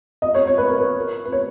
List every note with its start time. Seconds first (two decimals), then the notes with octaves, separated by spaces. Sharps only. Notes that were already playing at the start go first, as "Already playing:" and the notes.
0.22 D#5
0.35 C#5
0.47 C#5
0.58 B4
0.68 A#4
0.78 B4
1.25 B4
1.32 C#5